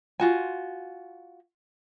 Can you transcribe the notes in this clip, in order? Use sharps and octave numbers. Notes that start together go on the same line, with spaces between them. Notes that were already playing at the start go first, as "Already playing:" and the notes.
F4 F#4 G#5